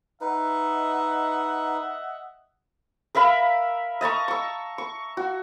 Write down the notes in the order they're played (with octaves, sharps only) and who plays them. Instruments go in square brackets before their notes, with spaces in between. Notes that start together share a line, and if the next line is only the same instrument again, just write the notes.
[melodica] D#4 B4 [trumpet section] D#5 E5 F#5
[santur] A#4 E5 F5 B5
D#5 A5 A#5 C#6
C#6 E6
C#6
F#4